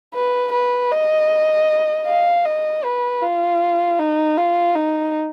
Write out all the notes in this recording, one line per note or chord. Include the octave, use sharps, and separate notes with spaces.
B4
B4
D#5
F5
D#5
B4
F4
D#4
F4
D#4